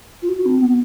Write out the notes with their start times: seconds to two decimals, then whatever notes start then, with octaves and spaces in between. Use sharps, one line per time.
0.22 F4
0.29 F#4
0.46 C4
0.62 B3